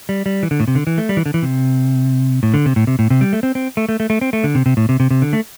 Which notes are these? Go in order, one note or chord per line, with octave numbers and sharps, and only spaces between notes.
G3
G3
E3
D3
A2
C3
D3
E3
A3
G3
E3
D3
E3
C3
A2
D3
C3
A2
C3
A2
C3
G3
A3
C4
C4
A3
A3
A3
A3
C4
A3
D3
C3
C3
A2
C3
C3
C3
D3
A3